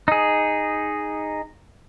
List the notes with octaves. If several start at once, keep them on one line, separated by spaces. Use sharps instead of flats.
D#4 G#4